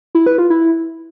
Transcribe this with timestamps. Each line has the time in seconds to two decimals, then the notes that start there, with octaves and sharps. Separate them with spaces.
0.15 E4
0.26 B4
0.38 F4
0.50 E4